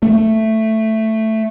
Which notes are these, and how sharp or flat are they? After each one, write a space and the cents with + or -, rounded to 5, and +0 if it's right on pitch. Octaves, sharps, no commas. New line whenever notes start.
A3 +5